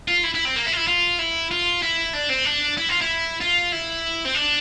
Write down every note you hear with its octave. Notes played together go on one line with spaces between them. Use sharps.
F4
E4
E4
C4
A#3
E4
F4
E4
F4
E4
F4
E4
D4
C4
D4
E4
F4
E4
F4
E4
C4
D4